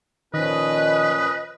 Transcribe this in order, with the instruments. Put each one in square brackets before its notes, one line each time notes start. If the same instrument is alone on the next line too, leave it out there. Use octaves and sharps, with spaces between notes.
[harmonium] A#2 F3 C#4 [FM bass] D#3 [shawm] B4 [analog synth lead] D#5